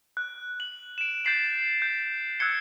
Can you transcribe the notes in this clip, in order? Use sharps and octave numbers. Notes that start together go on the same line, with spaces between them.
F#6
F#7
D7 E7
G6 A6 B6 C7 E7 F#7
G6
E6 F#6 G#6 C#7 G7